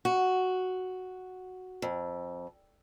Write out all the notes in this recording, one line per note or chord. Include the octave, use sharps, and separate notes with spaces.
F#4
F2